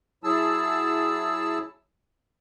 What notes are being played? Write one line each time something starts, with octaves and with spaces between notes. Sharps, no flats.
F#3 E4 G#4 A5 E6